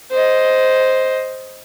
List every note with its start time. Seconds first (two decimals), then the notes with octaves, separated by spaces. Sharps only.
0.11 C5 D#5